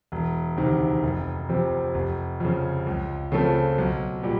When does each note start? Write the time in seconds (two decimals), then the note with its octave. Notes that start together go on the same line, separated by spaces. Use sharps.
0.12 E1
0.57 D2 C3 D#3
1.03 F1
1.49 F2 C3
1.95 F1
2.40 F2 C#3
2.87 C#2
3.32 C#3 F3 A3 C4
3.78 B1
4.23 A#2 G3